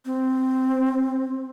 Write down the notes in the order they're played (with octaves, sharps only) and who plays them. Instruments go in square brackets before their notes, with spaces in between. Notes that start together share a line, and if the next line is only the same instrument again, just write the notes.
[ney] C4